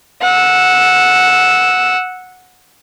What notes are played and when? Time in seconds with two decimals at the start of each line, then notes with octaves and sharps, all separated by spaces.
0.22 F#5 E6